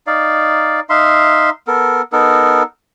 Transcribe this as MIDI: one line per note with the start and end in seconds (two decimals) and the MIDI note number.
0.07 0.80 63
0.07 0.80 74
0.07 0.80 77
0.90 1.50 63
0.90 1.50 76
0.90 1.50 77
0.90 1.50 84
1.67 2.02 59
1.67 2.02 69
1.67 2.02 70
2.13 2.63 59
2.13 2.63 63
2.13 2.63 69
2.13 2.63 70